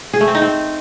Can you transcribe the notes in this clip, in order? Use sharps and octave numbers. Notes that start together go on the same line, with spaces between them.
G#4
A3
C4
D#4
C4